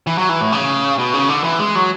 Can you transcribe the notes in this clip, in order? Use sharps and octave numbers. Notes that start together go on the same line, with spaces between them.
E3
F#3
E3
A2
C#3
B2
C#3
D3
E3
G#3
F#3